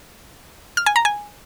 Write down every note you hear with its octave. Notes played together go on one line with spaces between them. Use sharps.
F6
G#5
A#5
G#5